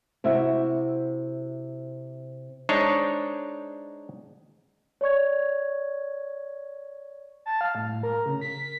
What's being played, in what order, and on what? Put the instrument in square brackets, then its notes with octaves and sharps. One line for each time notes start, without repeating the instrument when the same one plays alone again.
[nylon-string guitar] C3 E4 F#4 E5
[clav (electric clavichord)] G#3 D4 D#4 C5 C#5
[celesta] C#5 D5 C#6 G#6
[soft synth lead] A5
F5
A2
A#4
C#3
B6